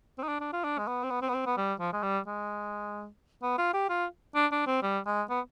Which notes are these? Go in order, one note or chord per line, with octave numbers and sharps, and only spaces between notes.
C4
D#4
D4
D4
F4
D4
G#3
B3
C4
B3
C4
B3
C4
B3
G3
F3
G#3
G3
G#3
B3
F4
G4
F4
D4
D4
C4
G3
G#3
B3